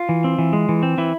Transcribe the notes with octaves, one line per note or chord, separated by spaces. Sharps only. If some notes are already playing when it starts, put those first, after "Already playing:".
Already playing: F4
E3
C4
E3
G#3
E3
C4
E3 E4